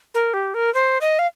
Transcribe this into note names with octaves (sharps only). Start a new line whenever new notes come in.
A#4
G4
A#4
C5
D#5
F5